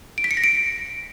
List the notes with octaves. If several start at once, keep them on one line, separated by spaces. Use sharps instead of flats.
D7
B6
C#7
A#6
D7